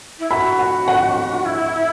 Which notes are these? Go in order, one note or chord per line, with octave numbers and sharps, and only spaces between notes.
E4
F#4 B5
F#5
F#5
E4